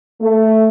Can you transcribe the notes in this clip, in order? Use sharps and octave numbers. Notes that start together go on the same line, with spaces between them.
A3